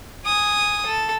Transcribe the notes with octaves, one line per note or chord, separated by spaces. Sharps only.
G#5 D#6
A4